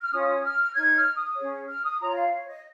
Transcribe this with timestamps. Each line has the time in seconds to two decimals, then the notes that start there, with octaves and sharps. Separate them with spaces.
0.01 F6
0.12 C#4 F4 C#5 D#6
0.43 F6
0.74 D#4 C#5 G#6
0.96 F6
1.17 D#6
1.37 C#4 G#4 C#5
1.69 F6
1.84 D#6
2.00 F4 C#5 A#5
2.15 F5
2.31 C#5
2.47 D#5